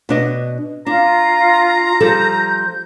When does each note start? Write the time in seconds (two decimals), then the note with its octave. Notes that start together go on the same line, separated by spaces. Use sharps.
0.09 B2 D4 D#5
0.87 D4 F4 A#5
2.00 F3 G3 A4 G6